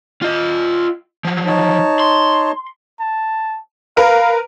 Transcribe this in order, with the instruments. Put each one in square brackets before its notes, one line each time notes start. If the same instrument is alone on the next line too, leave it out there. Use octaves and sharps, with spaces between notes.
[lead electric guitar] F4 D#5
F3 F#3
[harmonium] D#4 C#5 A5
[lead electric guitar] C6
[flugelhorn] A5
[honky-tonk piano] A#4 B4 [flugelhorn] F5